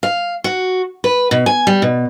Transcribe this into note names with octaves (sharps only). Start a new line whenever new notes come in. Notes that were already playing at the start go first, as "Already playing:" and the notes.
F5
F#4
B4
B2
G#5
G3
B2